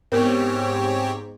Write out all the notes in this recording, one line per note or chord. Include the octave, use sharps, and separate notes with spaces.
G#2 B3 C4 G4 A#4 C#5